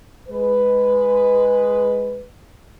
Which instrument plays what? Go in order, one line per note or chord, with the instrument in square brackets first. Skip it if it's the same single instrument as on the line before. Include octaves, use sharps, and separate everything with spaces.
[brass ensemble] G#3 B4